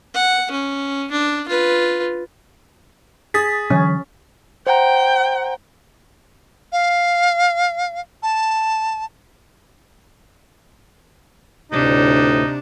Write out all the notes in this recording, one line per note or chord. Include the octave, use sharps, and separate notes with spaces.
F#5
C#4
D4
F4 B4
G#4 D#6 A6 B6
D3 E3 F#3 C#4
C5 F#5 G5 A#5
F5
A5
D2 A2 C3 D4 D#4